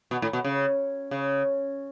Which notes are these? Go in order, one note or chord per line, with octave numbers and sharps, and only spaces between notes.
B2
A2
B2
C#3
C#3